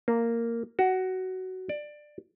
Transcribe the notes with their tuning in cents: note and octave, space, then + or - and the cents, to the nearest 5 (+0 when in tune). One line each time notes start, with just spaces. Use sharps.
A#3 -10
F#4 +15
D5 +15